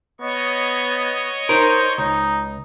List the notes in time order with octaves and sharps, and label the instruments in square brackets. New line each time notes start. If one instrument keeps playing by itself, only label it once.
[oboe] B3 [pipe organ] C#5 D#5 C#6
[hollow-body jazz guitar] D#4 A#4 [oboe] C5
[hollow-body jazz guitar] C#2 [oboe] D#4